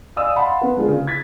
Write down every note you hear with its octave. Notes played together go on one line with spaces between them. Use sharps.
D5 D#5 F5 G#5 D#6 E6
F5 F#5 A5 B5 C6
B3 B4
G#3 A#3 D4 F4 G#4
C#3
G#6 A6 B6